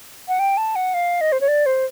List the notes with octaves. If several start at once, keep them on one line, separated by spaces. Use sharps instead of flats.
F#5
G5
A5
F#5
F5
D#5
C5
C#5
D5
C5